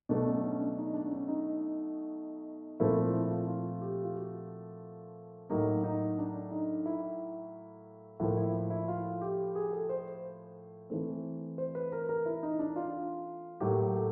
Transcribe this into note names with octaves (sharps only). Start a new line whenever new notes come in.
B2 F#3 A3 D4
C#4
C#4
D4
D#4
D4
D4
C#4
D#4
A#2 F3 A3 C4 E4
F4
E4
F4
F4
G4
F4
F#4
A2 F#3 A#3 D#4
D#4
D4
D#4
E4
A2 F3 A#3 E4
E4
E4
F4
G4
G#4
A4
C5
E3 A3 C4
C5
B4
A#4
A#4
E4
D#4
D4
F4
A2 F#3 A#3 G4
A4